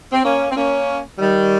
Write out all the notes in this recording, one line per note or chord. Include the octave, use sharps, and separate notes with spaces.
C4
A#3 C#4
C4
A#3 C#4
D#3 G3